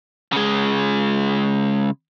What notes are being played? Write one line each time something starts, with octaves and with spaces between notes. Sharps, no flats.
C#3 G#3